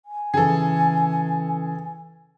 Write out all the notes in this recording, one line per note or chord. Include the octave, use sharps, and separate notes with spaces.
G#5
C#3 E3 G#4 A4